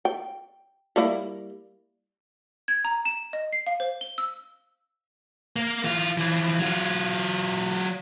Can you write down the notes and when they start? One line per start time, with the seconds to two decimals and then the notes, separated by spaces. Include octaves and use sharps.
0.05 G5
0.96 G3 A#3 E4
2.68 G#6
2.85 A#5
3.05 E7
3.33 D#5
3.53 C7
3.67 F5
3.80 C5
4.01 G7
4.18 E6
5.56 A#3
5.84 E3 F4
6.18 E3 F3
6.59 F#3 F4